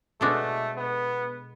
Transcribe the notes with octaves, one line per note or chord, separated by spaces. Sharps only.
B2 G#3 A3 D4 F#4 A4
B3